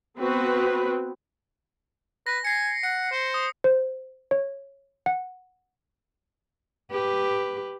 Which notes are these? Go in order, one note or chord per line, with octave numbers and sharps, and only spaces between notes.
B3 C4 F#4 B4
B4 A#6
G#5 A#6 C7 C#7
F#5 C#7
C5
D#6
C5
C#5
F#5
G4 B4